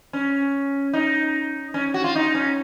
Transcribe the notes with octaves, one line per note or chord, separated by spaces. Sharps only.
C#4
D#4
C#4
F#4
F4
D#4
C#4